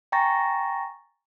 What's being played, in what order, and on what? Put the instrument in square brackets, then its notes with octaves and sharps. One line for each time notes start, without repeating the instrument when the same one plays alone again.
[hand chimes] G5 G#5 A#5 C#6 A6 A#6